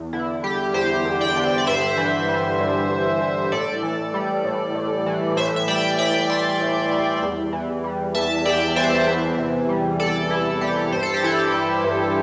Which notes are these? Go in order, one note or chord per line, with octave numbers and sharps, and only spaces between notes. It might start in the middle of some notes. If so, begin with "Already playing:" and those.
Already playing: E2
D3 E4
G3 G4
E2 G4 C5
E2
D5 G5
D3
D5
G2 C5 E5
E3
G3
G2
G2
E3
A2 A4 D5
E3
G3
A2
A2
E3
A2 C5 E5
E5
G3 D5 G5
A2 D5 G5
G3 G5 C6
A2
G3
E2
E3
G3
E2 E5 A5
E2 D5 G5
E3 C5 E5
E2
C3
G3
E2 A4 D5
E2 E4
C3 G4
G2 C5
A4
G4
E3 E4 A4
G3
G2